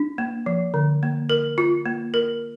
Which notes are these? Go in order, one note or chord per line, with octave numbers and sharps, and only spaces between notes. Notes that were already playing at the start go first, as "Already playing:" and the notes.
Already playing: D4
A#3
F3
D3
A#3
A#4
F4
A#3
A#4